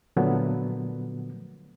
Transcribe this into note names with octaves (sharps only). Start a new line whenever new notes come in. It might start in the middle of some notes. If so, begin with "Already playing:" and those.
A#2 D3 F3 F#3 A3 B3